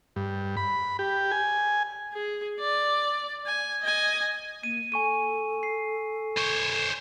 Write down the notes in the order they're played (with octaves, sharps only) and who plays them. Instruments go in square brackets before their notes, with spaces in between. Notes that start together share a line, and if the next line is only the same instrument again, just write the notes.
[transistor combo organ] G2
B5
G4
G#5
[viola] G#4
D5
G#5
D#5 G#5
[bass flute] A#3 [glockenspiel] D#7
[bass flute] A4 [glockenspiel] G#5 C#6 D#7
[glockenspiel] C7
[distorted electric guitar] C5 C#5